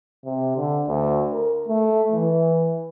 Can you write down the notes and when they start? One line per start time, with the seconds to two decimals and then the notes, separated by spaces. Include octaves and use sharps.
0.25 C3
0.57 D3
0.88 D2
1.33 A#4
1.68 A3
2.12 E3